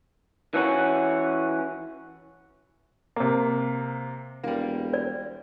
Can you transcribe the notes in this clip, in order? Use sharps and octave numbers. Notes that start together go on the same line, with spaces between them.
E3 C#4 F#4
C3 A#3
E1 G3 A#3
D5